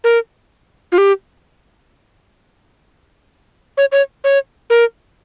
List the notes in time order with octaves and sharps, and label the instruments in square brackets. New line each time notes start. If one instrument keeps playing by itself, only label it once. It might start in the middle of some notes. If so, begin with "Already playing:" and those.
[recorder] A#4
F4
G4
C#5
C#5
C#5
A#4